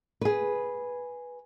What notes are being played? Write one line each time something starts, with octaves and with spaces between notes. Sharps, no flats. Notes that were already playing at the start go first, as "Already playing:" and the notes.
G#4 B4